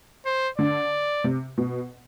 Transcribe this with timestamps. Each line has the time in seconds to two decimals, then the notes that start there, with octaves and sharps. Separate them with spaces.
0.26 C5
0.58 D3 D5
1.24 C3
1.58 B2